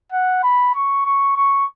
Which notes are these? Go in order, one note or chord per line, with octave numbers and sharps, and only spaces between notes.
F#5
B5
C#6
C#6
C#6